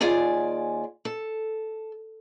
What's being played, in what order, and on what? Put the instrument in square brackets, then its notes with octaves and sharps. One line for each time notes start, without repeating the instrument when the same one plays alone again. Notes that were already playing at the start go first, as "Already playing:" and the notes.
[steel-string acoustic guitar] D#2 F4 G#4 D5 G#5
A4